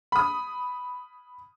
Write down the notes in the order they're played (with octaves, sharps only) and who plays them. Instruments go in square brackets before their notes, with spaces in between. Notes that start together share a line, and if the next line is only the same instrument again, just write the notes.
[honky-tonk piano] B5 D#6